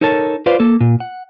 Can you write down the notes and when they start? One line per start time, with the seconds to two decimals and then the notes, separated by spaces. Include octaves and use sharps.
0.01 D#4 A4 A#4 C#5 A5
0.46 F4 B4 C5 D5 F5
0.60 A#3 A4
0.81 A#2
1.00 F#5